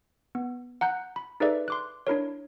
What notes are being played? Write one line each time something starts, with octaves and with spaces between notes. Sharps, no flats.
B3
F#5 A#5 F#6 G6
B5
D#4 G#4 A4 B4 D5 E5
C6 D6 F#6
D4 E4 A#4 C#5